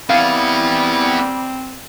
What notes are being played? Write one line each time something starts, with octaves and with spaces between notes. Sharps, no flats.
G3 B3 C4 E4 F5